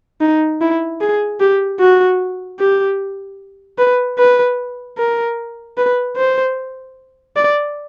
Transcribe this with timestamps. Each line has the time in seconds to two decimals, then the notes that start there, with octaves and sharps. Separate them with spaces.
0.21 D#4
0.61 E4
1.01 G#4
1.40 G4
1.80 F#4
2.60 G4
3.78 B4
4.18 B4
4.98 A#4
5.78 B4
6.17 C5
7.36 D5